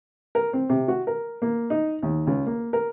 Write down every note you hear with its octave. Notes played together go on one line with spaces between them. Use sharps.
A#4
C4
C3
F#4
A#4
A#3
D#4
D#2
C#2
A#3
A#4